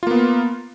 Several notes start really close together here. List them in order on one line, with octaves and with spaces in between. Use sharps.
F4 A#3 B3